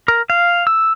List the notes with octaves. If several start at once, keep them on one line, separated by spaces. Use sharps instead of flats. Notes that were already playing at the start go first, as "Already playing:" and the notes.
A#4
F5
E6